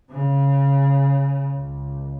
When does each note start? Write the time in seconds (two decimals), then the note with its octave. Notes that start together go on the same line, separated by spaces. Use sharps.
0.10 C#3
1.56 C#2